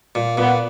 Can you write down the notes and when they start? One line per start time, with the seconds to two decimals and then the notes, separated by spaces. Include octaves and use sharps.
0.15 A#2
0.37 A#2 B3